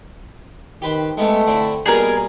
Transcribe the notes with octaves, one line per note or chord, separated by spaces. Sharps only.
D#3 G4 B4 C5
G#3 A3 B3 C4
D3 C4 E4
B2 G3 A#3 G#4 A#4 G#5